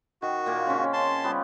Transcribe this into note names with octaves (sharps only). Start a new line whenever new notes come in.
D#3 F#4
A#2 A#3 A#4
C#3 C4 C#4
A5 C6
F3 G3 B3